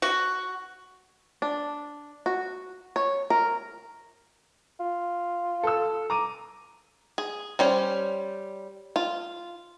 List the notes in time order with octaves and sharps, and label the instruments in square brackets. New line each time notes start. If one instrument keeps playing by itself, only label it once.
[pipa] F#4
[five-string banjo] D4
F#4
C#5
A#4
[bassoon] F4
[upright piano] A4 E6
A#5 D6 D#7
[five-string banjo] G#4
G3 C#4 C5
F4